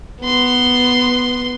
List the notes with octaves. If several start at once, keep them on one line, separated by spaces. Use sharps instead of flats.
B3 C6